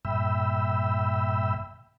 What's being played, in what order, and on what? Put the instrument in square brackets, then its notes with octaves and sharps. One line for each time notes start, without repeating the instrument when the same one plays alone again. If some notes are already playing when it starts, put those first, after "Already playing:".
[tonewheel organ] G2 A#2 E5 G5 B5 E6